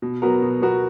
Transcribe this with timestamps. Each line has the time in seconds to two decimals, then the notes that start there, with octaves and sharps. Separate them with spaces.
0.02 B2
0.22 F#3 B3 F#4 A#4
0.42 B2
0.61 F#3 B3 F#4 A#4